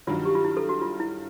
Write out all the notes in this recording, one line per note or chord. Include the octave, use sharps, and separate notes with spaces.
G2 D#3 F#3 F4
G4
F4
E4
A4
F#4
F4
E4